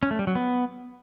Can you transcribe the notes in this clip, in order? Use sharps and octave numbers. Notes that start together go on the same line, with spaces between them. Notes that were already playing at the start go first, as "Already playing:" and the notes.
C#4
A3
G3
F#3
B3